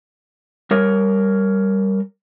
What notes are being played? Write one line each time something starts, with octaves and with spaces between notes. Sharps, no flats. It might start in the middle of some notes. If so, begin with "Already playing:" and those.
G3 A#4 C#5